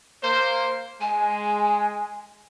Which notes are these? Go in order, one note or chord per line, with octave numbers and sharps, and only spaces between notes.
A#3 C5
G#3 G#5